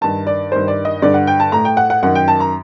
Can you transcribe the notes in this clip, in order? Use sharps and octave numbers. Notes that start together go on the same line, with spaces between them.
G2 D#3 A5
D5
G2 D#3 C5
D5
D#5
G2 D3 D5
F#5
G5
A5
A2 A#5
G5
F#5
F#5
F#2 D#3 F#5
G5
A5
A#5